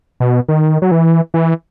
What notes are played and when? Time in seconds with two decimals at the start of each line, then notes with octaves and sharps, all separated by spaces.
0.20 B2
0.49 D#3
0.82 F#3
0.91 E3
1.34 E3